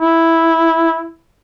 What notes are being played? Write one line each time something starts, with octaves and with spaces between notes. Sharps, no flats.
E4